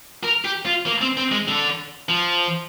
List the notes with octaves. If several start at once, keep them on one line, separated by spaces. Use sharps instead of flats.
A#4
G4
F4
A#3
C4
C4
G#3
D3
F3